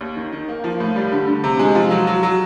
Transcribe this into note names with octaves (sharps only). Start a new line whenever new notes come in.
D#2
D#3
D#3
A#3
F3
A2
G3
D3
D3
C3
G#3
F3
F#3
F#3
F#3